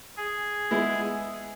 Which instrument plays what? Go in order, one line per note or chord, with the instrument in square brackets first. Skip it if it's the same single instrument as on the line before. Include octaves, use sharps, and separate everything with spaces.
[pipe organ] G#4
[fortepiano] G#3 B3 E4